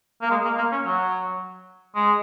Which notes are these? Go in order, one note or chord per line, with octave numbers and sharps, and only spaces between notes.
A#3
G#3
A#3
A#3
C#4
F#3
G#3